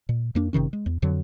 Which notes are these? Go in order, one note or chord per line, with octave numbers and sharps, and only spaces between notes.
A#2
F2 A#3 D4
F#1 C3 D#3 C#4
G#3
E2
F2 D3 F#3